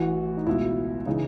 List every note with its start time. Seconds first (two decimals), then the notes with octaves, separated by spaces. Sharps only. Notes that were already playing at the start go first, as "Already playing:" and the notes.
Already playing: A1 A2 E3 F#4
0.37 D#4
0.47 C#2 B2 E4
1.06 C#3 E3 D#4